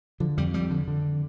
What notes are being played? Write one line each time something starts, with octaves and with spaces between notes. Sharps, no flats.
D3 F3
F2 G3
F2 G3
D3
D3